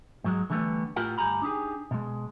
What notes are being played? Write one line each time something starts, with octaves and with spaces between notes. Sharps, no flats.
G#2 F#3 G#3
D3 E3 F#3 G3 A3 B3
A2 F4 G4 A#4 F#5
D2 G2 G4 G#5 A#5 B5
D4 D#4 G4 G#4
B2 G#3